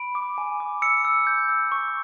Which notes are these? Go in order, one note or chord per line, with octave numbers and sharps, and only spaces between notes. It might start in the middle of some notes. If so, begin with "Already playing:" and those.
Already playing: B5 D7
D6
G#5
D6
E6 C#7
E6
G6
E6
C#6